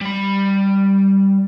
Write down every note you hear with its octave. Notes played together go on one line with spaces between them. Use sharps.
G3 B5